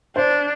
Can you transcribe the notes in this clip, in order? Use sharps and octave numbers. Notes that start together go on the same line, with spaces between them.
D4 C5